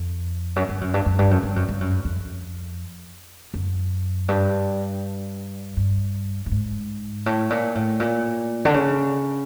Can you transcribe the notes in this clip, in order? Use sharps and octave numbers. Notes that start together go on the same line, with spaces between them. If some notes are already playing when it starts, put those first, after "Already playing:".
Already playing: F2
F#2
G2
F#2
G2
F#2
G2
F#2
G2
F#2
G2
F#2
F2
F#2
G2
G2
G2
G#2
A2
A#2
A2
A#2
D3
C#3